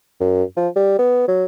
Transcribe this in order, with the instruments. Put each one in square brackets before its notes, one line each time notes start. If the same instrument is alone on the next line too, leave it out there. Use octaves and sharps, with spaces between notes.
[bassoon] F#2
F3
G3
B3
F#3